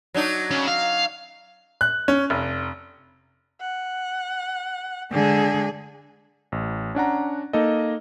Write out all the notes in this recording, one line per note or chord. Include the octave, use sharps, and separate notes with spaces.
F#3 D4 D#4
C#3
F5
F#6
C#4
F1
F#5
D3 G#3 G#4
A1
C#4 D4 F#5 A#5
A#3 D#4 A4 D#5